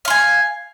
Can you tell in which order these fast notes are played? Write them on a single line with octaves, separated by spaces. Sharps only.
F5 C6 G#5